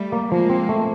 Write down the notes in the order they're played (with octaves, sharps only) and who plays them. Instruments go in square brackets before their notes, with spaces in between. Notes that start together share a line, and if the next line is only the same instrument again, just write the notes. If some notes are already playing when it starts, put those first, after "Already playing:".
Already playing: [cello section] G3 A3
[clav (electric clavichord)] A#3
[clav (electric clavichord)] F3 [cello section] G#3 A#3
[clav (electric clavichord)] C4
A3